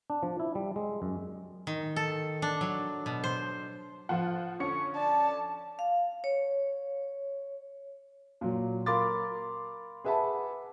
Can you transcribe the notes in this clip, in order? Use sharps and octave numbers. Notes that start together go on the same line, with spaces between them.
D4
F3
E4
G3
G#3
F#2
D#3
A4
D4
F#3
B2
C5
F3 F4 C5 F#5
D3 C#4 C#6 C#7
D5 A5
F5
C#5
A#2 F#3
A#4 F5 B5 C6 D6 A6
G#4 B4 E5 F#5 A5 B5